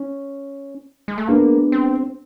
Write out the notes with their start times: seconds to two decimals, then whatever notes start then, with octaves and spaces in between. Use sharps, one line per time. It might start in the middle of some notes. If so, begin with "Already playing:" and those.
Already playing: C#4
1.08 G#3
1.18 A3
1.27 G#3 A#3 B3 D4
1.72 C4